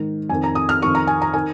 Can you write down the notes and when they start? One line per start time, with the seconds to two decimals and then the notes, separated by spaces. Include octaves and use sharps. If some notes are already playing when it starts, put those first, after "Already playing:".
Already playing: G#2 D#3
0.29 F2 D#3 G#5
0.43 A#5
0.55 D#6
0.69 F6
0.82 F2 D#3 C#6
0.95 A#5
1.07 G#5
1.22 A#5
1.33 D#3 G#5